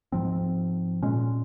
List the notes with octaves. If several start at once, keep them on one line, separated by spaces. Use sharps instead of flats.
G#2 F3 C4
A#2 G#3 C#4